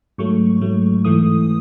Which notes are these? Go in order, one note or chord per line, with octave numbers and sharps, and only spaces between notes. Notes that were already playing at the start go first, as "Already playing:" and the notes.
G#2 F#3 A3 C#6
G#2 F#3 A3
G#2 E3 A3 D#6